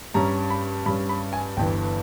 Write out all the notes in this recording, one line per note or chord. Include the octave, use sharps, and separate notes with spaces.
G2 G3 C#4 A#5
B5
G2 G3 C#4 B5
B5
G#5
G1 G2 E3 G5